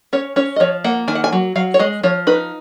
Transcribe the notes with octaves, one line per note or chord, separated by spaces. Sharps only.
C#4 C#5
C#4 C#5
D#5
F3 C#5
A#3 F#5
D#3 G#5
F#5
G#5
F#3
F#3 F5
C#5
G#3 D#5
F3 C#5
D#4 B4